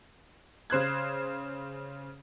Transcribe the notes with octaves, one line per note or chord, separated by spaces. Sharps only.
C#3 C5 F#6 G#6